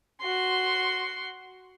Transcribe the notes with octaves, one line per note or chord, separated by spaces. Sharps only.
F#4 C6